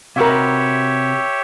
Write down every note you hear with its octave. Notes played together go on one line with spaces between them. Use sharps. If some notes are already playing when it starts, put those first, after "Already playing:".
C3 F#4 G4 A#4 B4 C#5 E5 F5